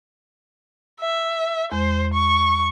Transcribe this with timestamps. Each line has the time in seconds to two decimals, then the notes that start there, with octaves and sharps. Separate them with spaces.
1.00 E5
1.72 E2 G#3 C5
2.13 C#6